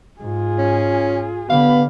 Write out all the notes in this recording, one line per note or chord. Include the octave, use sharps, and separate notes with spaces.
G#2 F4 G#4
C#4
D3 B3 G4 F5 B5